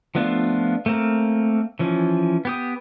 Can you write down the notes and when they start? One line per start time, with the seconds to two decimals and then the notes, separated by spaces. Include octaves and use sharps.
0.15 F3 A3 B3 D4 F4
0.86 A3 A#3 C4 A#4
1.79 E3 F3 C#4
2.45 B3 G4 D#6